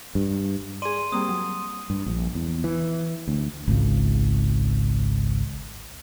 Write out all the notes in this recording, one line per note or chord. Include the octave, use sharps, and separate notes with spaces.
G2
G#4 D5 C6 D#7
G3 A#3 C4 D#6
F#3
G2
A#1
E2
E3
D2
G#1 C#2